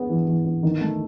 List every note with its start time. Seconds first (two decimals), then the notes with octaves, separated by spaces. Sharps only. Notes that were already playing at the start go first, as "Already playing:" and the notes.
Already playing: B3 G#4
0.10 E3
0.27 E3
0.45 B3
0.63 D#3
0.81 A3